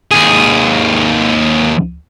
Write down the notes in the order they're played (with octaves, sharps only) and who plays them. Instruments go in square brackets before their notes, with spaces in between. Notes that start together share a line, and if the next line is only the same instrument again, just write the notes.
[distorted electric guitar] D#2 G#4